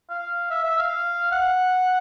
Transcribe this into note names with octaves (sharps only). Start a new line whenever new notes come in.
F5
E5
E5
F5
F#5